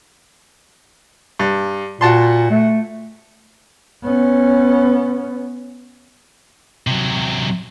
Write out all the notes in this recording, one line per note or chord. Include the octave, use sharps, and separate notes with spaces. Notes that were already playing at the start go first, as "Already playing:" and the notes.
G2
A#2 F#4 A5 C6
A3
B3 C#4
C3 F#3